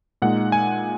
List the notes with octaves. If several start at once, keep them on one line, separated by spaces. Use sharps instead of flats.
A#2 G#3 D#4 F#5
G#5